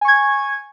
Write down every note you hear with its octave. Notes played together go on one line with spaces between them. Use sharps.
G#5 C#6 G#6